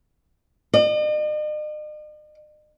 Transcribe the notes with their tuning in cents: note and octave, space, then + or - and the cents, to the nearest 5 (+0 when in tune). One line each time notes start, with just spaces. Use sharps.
D#5 -45